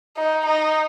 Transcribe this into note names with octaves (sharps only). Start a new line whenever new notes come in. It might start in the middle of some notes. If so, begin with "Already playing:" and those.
D#4
D#4